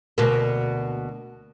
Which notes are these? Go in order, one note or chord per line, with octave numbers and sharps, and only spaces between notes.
D2 B2 A#3